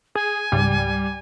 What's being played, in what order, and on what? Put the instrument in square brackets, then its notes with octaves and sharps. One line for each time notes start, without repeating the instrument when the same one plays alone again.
[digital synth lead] G#4 [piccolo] G#5
[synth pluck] C#2 G#2 [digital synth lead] G3